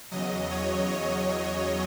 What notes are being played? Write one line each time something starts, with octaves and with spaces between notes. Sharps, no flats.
E2 C#3 F#3 D#5
C#5
C#5